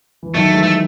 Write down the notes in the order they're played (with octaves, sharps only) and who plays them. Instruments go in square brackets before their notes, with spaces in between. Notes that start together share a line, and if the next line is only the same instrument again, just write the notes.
[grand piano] E3
[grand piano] D#3 F#3 [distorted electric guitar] A3
[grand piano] E3 G#3
[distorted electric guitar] A3